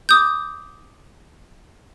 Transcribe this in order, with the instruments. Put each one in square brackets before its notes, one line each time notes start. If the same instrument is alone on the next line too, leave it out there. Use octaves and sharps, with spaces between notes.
[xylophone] D6 D#6 G6